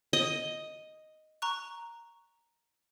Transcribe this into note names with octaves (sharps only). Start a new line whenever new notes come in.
D#5
A#5 C#6 F#6